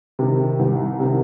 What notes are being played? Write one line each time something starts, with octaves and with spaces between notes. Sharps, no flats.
C3 D#3
C2
C3 D#3